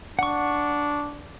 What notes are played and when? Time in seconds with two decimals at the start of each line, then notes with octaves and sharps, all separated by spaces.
0.19 D4 F#5 C#6